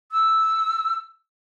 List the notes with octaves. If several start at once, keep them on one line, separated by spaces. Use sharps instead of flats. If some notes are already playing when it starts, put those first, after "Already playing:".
E6